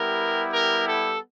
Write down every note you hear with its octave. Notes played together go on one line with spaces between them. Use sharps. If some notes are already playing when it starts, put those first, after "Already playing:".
Already playing: G3 B3 E4 G4 A#4
A#4
A4